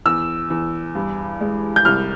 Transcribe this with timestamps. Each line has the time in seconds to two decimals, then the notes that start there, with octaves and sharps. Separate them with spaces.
0.06 E2 E6
0.50 E2
0.95 G2
1.41 G#3
1.76 G6
1.85 C2 F6